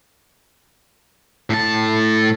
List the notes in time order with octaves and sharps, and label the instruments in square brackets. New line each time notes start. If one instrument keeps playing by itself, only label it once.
[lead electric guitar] A2 A5